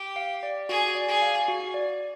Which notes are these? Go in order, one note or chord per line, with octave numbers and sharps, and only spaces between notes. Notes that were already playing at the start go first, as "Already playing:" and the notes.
Already playing: G4
F5
D5
F#4 G#4
D5
G#4
F5
F#4
D5